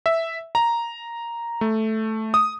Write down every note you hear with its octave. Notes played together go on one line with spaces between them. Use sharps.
E5
A#5
A3
D#6